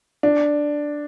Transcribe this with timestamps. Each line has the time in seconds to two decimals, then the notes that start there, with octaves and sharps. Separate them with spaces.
0.23 D4